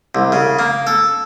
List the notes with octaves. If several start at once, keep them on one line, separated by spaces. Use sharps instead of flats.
C2
C#3
A#3
A4